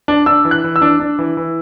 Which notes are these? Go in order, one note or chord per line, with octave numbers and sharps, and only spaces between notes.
D4
D4 E6
E3
F#6
E3
E6
D4
D4
E3
E3